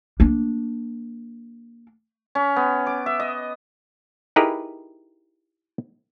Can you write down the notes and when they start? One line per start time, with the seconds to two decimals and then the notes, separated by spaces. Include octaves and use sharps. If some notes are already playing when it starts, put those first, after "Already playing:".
0.20 A#3 D4
2.35 C#4
2.56 B3
2.87 D6
3.06 E5
3.20 D#5
4.36 D#4 E4 G4 G#4 A#4 B4